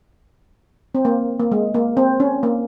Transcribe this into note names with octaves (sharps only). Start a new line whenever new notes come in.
C4
A#3
A#3
G#3
A#3
C4
C#4
A#3